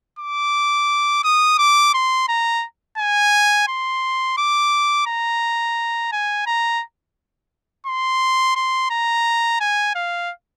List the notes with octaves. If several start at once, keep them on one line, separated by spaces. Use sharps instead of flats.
D6
D#6
D6
C6
A#5
G#5
C6
D6
A#5
G#5
A#5
C6
C6
A#5
G#5
F5